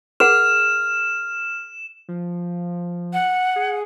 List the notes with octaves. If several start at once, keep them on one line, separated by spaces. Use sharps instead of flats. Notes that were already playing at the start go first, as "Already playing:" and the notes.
G#4 A#4 F#5 F6 E7
F3
F#5
G#4